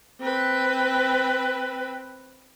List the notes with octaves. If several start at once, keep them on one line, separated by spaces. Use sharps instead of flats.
C4 B4